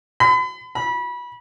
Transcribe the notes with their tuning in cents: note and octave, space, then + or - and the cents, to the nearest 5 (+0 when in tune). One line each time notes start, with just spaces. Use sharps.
B5 +40
B5 -25